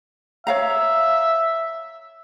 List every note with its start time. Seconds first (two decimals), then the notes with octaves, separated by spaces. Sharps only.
0.47 C#5 E5 F5 A#5